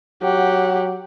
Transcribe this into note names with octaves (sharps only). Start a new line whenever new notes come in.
F#3 G4 F#5